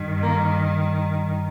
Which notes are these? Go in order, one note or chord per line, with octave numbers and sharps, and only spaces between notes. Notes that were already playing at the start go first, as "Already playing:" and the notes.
Already playing: G2 D#3
A#3